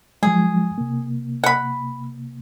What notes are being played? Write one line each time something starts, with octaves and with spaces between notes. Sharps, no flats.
F3 F#3 G#3 G#4
C3 A#3
F#5 B5